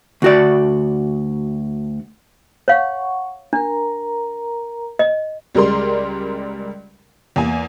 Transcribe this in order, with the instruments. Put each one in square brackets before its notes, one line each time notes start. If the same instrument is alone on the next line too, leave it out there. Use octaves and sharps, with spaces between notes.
[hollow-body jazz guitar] D2 F#4 D5
[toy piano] C#5 F5 [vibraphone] F#5 C#6
[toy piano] D4 [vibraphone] A#4 A#5
[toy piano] D#5
[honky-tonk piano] C#2 G3 G#3 A#4 D5 C6
E2 A#3 G#5